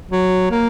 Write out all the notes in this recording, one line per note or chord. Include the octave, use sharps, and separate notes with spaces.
F#3
A#3